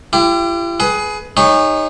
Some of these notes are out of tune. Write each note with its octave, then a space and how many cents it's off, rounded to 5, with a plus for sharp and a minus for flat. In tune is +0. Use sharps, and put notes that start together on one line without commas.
E4 +45 G4 +0
G#4 +20 B4 +0
D#4 +0 G#4 -40 C#5 -5